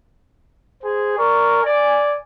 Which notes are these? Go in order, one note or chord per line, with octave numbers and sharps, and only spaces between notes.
G#4 C5
A#4 D5 C#6
D5 G#5